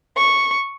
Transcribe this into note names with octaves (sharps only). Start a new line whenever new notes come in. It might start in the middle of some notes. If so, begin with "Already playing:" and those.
C#6